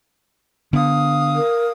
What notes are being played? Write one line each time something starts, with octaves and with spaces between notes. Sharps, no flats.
D3 B3 F5 D#6
A#4